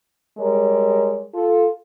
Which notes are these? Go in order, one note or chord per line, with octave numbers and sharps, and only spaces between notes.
G3 G#3 A#4 C#5
F4 A4